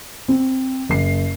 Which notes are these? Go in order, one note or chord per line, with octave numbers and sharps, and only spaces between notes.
C4
F#1 C7